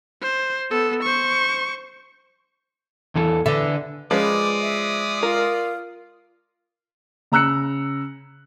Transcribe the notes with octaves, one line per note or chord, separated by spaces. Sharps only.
C5
B3 A4
C5 C#6
E2 E3 A4
D3 B4 E5
F3 G#3 C#4 B4 D5 D6 D#6
E5
F4 A#4
C#3 A#5 E6 F#6 C#7